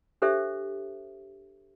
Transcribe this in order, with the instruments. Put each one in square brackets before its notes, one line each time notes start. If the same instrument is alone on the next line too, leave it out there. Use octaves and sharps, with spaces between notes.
[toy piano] D4 G4 A4 C5 E5